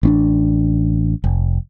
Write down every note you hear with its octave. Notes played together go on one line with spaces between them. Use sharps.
A1 C4 D4
F1